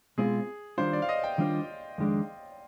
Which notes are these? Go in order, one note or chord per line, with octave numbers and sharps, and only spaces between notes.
B2 G#3 C4 F4 G#4
D#3 G3 D4 F4 C5
D5
F5
D#5
G5
D#3 G3 D4 F4 C5
F2 D#3 G#3 D4